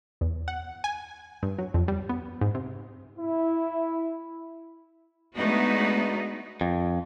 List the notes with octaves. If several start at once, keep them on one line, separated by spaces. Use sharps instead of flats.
E2
F#5
G#5
G2
F#3
F2
G3
B3
G#2
C3
E4
G#3 A3 B3 D4 D#4 F#4
F2